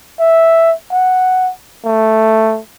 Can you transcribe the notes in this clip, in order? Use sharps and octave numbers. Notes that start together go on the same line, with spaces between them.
E5
F#5
A3